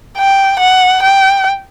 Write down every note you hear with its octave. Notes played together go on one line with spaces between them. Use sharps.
G5
F#5
G5